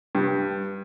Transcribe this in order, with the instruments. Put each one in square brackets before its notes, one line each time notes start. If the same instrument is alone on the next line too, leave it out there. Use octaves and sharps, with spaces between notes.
[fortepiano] G2